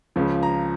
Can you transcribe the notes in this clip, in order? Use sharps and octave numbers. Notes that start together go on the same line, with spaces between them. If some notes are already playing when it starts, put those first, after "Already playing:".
C#2 C#3 F3
A#5